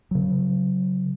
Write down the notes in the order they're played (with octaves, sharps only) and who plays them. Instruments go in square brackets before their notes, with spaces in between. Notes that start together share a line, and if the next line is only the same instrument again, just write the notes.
[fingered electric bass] C#3 F#3